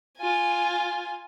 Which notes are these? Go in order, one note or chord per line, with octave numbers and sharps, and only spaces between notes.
F4 G#5